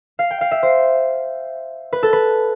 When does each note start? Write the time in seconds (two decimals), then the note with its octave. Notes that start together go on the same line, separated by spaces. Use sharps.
0.19 F5
0.31 G5
0.41 F5
0.51 E5
0.63 C5
1.93 B4
2.03 A4
2.13 B4